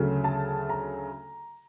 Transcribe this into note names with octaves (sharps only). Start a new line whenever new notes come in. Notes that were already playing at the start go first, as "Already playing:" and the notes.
Already playing: D2 C#3 F#3 A3
A5
A#5